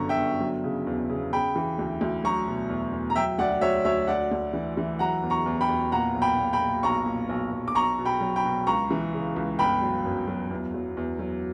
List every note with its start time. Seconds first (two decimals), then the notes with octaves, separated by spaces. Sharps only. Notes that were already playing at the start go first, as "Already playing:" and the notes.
Already playing: G1 F#2 D3 A#5 C#6
0.09 E5 G5
0.17 G1
0.40 F#3
0.64 C#3
0.87 E2
1.10 C#3
1.33 C#3 G5 B5
1.56 E3
1.79 D2
2.01 D2
2.24 F#3 A#5 C#6
2.48 B2
2.70 E2
2.93 E2
3.10 A#5
3.16 F#3 E5 G5
3.39 D2 D5 F#5
3.61 F#3 C#5 E5
3.85 D2 C#5 E5
4.07 D2 D5 F#5
4.31 D2
4.53 E3
4.77 E3
4.99 F#3 F#5 A#5
5.23 E2
5.30 A#5 C#6
5.46 E2
5.61 G5 B5
5.69 E2
5.92 A#2 F#5 A#5
6.15 B1
6.22 G5 B5
6.38 A#2
6.53 G5 B5
6.61 A#2
6.83 B1 A#5 C#6
7.06 A#2
7.29 B1
7.53 B1
7.68 D6
7.75 B1 A#5 C#6
7.99 B2
8.05 G5 B5
8.21 F#3
8.36 G5 B5
8.44 B2
8.67 C#2 A#5 C#6
8.91 E3
9.13 C#3
9.36 C#2
9.59 G1 G5 B5
9.82 F#3
10.05 F#2
10.28 F#3
10.51 E2
10.74 F#3
10.97 E2
11.19 F#3